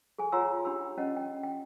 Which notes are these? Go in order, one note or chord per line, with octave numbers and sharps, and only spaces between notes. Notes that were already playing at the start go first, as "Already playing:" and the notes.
G#4 A4 G#5
F4 C#5 F#5 A#5 C6 E6
D4 G4 B5 E6
C#4 D#5 F#5
G5
G5